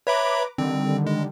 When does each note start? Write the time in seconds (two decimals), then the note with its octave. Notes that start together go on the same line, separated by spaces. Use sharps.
0.07 B4 C#5 E5 A#5 B5 D6
0.58 D3 D#3 G3 C4
1.07 G#3